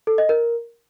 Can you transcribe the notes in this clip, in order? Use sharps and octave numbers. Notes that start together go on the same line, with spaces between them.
A4
D#5
A#4